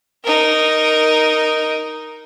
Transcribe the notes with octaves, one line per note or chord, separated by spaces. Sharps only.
D#4 A#4